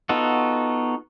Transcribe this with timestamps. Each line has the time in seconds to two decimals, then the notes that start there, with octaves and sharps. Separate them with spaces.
0.09 B3 D#4 F4 F#4 A4